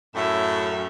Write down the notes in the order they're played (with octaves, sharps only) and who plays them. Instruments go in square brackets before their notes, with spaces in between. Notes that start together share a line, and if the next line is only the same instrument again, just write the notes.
[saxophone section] F#2 [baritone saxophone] A2 [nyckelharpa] E5